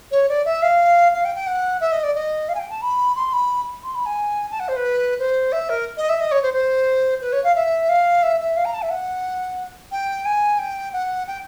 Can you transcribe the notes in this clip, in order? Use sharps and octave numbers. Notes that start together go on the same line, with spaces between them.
C#5
D5
E5
F5
F5
G5
G5
F#5
E5
D#5
D5
D#5
F5
G#5
G5
A5
B5
C6
B5
C6
B5
G#5
A5
F#5
C5
B4
C5
E5
A#4
D#5
E5
D#5
C#5
C5
C5
B4
C#5
F5
E5
F5
E5
E5
F5
A#5
A5
E5
F#5
G5
G#5
G5
F#5
G5